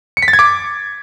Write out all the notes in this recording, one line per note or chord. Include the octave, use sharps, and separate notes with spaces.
C#7
B6
A6
G#6
D6